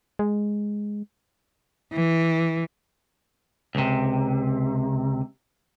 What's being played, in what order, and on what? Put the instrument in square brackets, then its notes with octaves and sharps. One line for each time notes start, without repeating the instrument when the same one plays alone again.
[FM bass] G#3
[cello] E3
[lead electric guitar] C#2 C3